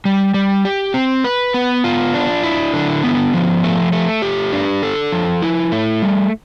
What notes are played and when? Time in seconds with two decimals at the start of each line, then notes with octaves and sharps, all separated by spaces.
0.05 G3
0.34 G3
0.65 G4
0.94 C4
1.24 B4
1.54 B3
1.84 F4
2.14 D4
2.43 E4
2.74 D3
3.04 B3
3.34 F3
3.63 A3
3.92 A3
4.22 G4
4.52 D4
4.83 A4
5.12 F3
5.42 E4
5.72 A3
6.02 G3